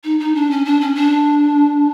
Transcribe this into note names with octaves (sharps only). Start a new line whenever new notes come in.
D#4
D#4
D4
C#4
D4
C#4
D4